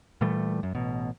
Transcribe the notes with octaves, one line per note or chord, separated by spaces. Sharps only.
A#2 E3 G3 A3
F#2
A1 B2